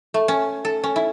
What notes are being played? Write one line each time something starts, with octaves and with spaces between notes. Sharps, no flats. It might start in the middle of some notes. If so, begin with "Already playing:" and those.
A3
C#4
A4
C#4
E4